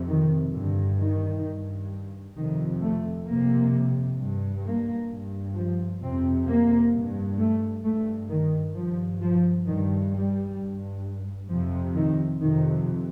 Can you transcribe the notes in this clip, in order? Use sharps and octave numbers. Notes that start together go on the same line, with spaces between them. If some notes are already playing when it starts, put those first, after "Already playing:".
Already playing: F2 C3
D#3
G2 D3
D#3
G2
F2 C3 D#3
A3
F2 C3 A#3
G2
A#3
G2
F3
F2 C3 C4
A#3
G2
A3
G2 A3
D#3
G2 F3
F3
G2 D#3
G3
G2
F2 C3 F3
D#3
F2 C3 D#3